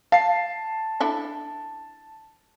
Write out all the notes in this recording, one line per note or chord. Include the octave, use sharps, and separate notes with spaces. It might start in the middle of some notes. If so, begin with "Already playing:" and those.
F5 A5 C7
D4 E4 A4